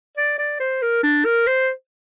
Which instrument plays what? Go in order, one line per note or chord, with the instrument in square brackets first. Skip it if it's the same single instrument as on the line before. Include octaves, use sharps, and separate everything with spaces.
[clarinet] D5
D5
C5
A#4
D4
A#4
C5